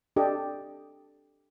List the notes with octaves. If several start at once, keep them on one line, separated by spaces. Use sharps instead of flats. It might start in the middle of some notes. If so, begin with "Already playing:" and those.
D4 G4 A4 D5 D#5